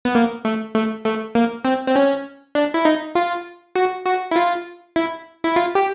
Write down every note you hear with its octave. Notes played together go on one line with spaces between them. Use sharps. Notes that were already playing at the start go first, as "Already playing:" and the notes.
B3
A#3
A3
A3
A3
A#3
C4
C4
C#4
D4
E4
D#4
F4
F#4
F#4
E4
F4
E4
E4
F4
G4